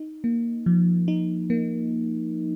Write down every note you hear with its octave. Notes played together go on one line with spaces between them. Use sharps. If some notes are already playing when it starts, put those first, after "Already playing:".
Already playing: D#4
A#3
F3
D#4
A#3